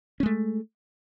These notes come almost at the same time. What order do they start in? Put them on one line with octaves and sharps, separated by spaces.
C#4 G#3 A3